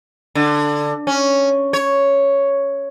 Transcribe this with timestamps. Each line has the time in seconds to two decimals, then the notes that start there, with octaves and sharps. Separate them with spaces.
0.35 D3
1.07 C#4
1.73 C#5